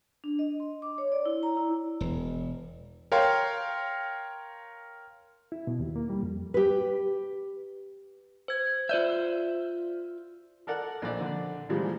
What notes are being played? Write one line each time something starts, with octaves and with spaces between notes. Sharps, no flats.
D4
D#5
C6
D6
C#5
D5
E4
A#5
E4
E1
A#4 C#5 F5 G5 C6
E4
B2
D#2
A#3
G3
F2
G4 B4
C5 G#6
F4 C5 D5 E5 G6
A4 A#4 D5 F#5
A#1 D5
D3
A#2 D3 E3 F3 G3 G#3